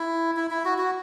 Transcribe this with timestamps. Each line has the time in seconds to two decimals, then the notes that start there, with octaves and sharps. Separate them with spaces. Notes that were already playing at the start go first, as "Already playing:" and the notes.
Already playing: E4
0.36 E4
0.51 E4
0.65 F#4
0.78 F#4